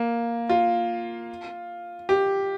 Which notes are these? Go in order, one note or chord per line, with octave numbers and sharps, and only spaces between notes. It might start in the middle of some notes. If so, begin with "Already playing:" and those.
Already playing: A#3
F4
G4